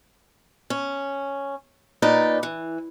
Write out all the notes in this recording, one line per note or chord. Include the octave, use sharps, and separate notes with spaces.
C#4
A#2 D#4 B4 D5
E3